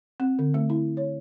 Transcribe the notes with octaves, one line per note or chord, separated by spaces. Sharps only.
C4
D3
A3
E4
C#5